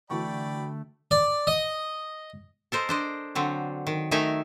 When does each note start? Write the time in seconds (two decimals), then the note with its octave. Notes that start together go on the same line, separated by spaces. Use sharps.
0.10 D3 E3 A3 F#4 D5 G5 B5 C#6
1.11 D5
1.47 D#5
2.72 A4 A#4 C5 D#5
2.89 D4 C5 D#5
3.35 D3 F#3 C4
3.87 D#3
4.11 D#3 A3 D#4 E5 G#5 A#5